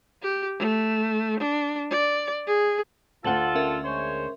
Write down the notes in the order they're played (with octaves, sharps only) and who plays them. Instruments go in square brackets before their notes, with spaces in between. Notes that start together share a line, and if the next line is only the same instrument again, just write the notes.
[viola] G4
A3
D4
D5
G#4
[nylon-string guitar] D2 F#5 [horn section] F4 A4 [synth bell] A6 F#7 G7
[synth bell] C#4 A#4 E5
[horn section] G#3 C5 C#5